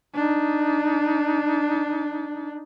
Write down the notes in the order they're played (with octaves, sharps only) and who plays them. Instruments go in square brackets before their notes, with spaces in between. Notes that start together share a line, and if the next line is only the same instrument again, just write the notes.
[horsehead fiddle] D4 D#4